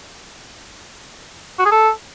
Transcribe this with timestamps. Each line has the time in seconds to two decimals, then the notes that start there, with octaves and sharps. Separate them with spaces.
1.59 F#4
1.65 G#4
1.72 A4